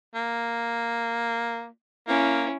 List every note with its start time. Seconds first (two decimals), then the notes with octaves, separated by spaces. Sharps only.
0.15 A#3
2.08 A#3 C#4 E4